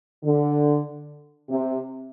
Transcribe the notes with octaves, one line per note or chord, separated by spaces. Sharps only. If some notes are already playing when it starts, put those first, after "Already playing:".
D3
C3